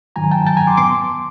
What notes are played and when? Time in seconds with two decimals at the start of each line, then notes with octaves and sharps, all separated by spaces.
0.16 G#2 D#3 F#3 G#5 A#5
0.31 G5 A5
0.47 G5 A5
0.57 G#5 A#5
0.67 C6 D6
0.77 B3 C6 D6